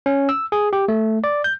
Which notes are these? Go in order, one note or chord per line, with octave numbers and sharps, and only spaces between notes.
C#4
E6
G#4
G4
A3
D5
G6